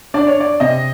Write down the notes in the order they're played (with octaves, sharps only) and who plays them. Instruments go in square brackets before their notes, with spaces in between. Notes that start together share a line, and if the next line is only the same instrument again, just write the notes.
[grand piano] D4 [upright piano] D5
[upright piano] C#5
D5
[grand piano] C3 [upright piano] D#5